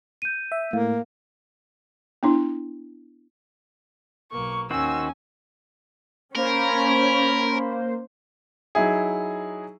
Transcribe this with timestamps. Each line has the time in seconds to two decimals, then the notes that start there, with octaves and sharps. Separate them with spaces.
0.22 G6 D#7
0.52 E5
0.73 A2 A#3 F5
2.23 B3 D4 E4
4.32 B1 A#3 C#6
4.71 D#2 D#3 C#4 F#4 C5 G#5 E6
6.36 A#3 C#4 A#4 C5 B5
8.75 F#3 D#4 E4 G#4